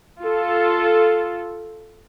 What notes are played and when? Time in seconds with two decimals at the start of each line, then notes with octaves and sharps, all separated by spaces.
0.23 F4 A4